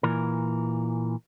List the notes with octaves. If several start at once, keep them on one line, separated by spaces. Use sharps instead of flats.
A#2 E3 A#4